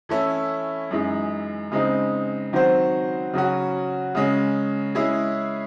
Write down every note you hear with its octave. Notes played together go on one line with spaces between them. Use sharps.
E3 A3 C#4 E4
F#2 E3 G#3 D#4
C#3 G#3 C4 D#4
D#3 F#3 C4 F#4 C5
C#3 F#3 C#4 F#4
C#3 G#3 C#4
G#3 C#4 E4 G#4